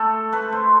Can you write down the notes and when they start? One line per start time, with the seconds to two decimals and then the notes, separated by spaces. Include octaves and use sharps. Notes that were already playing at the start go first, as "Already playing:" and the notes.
Already playing: A3 A4
0.32 A3 B4
0.52 C5